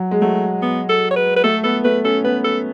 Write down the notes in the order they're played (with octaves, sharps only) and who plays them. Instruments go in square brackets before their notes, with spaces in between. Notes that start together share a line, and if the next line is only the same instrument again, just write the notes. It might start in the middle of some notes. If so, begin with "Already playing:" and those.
Already playing: [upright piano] F#3
G#3
[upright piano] F#3 [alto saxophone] A3
[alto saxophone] B3
A4
C#5
B4
B4
[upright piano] A3 [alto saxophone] A4
[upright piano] B3 [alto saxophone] A4
[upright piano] A3 [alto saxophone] B4
[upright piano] C#4 [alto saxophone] A4
[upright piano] B3 [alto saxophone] B4
[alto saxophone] A4